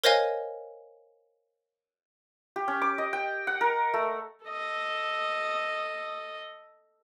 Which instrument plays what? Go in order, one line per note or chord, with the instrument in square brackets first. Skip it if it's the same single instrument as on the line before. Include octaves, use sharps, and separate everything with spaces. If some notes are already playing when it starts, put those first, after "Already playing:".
[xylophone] A#4 C5 C#5 D#5 F5 G#5
[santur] G4
C#4
D6
D#5
G5
F#5
A#4
A3
[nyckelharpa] A4 D#5